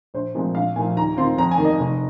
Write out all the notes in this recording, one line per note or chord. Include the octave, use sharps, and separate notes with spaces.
A#1 C5
A#2 F3 G#3 C4
A#1 F5
A#2 F3 G#5
D#2 A#5
D#3 C4 F4 C6
F2 A#5
G#5
D#3 A#3
D#5
F1